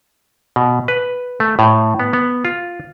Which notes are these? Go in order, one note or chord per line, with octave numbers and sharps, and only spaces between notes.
B2
B4
A3
A2
B3
B3
F4